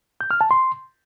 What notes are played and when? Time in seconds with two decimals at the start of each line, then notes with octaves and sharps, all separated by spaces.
0.21 G6
0.31 F6
0.41 A5
0.51 C6